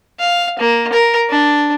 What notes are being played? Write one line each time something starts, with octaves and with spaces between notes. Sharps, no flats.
F5
A#3
A#4
D4